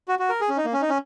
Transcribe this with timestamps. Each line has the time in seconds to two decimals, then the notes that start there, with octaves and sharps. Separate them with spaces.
0.08 F#4
0.19 F#4
0.29 A#4
0.41 G#4
0.49 C#4
0.57 D#4
0.65 A#3
0.73 C#4
0.82 D#4
0.90 C#4